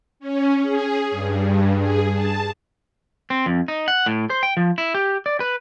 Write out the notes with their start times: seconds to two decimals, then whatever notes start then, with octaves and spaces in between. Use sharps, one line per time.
0.20 C#4
0.62 G#4
1.11 G2
1.79 G#4
2.13 A5
3.30 C4
3.46 F2
3.68 D#4
3.88 F#5
4.06 A2
4.30 C5
4.43 G5
4.57 F3
4.78 E4
4.94 G4
5.26 D5
5.40 B4